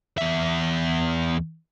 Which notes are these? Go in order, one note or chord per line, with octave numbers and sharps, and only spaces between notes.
E2 E5